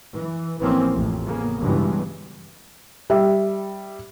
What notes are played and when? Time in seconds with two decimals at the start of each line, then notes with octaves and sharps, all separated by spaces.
0.13 E3
0.59 A1 E3 F3 A#3 C4 C#4
0.94 A1 F2
1.26 C#3 A#3 B3
1.61 C#2 G2 B2 E3 G3 G#3
3.10 G3 E5